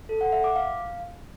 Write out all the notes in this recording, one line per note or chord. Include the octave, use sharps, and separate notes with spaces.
A4
F#5
E5
D6
F5